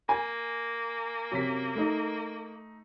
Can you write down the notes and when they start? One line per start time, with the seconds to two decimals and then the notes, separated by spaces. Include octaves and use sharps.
0.09 A#3 G#5
1.31 F#2 C3 B6
1.75 A3 D#4